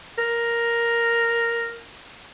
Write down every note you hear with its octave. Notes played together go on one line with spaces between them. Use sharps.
A#4